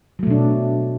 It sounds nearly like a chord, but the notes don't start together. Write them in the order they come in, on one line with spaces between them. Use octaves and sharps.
F#3 A3 B2 D4